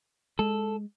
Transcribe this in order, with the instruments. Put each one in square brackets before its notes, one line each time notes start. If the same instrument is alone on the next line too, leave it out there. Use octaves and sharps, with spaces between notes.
[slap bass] G#3 [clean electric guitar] A4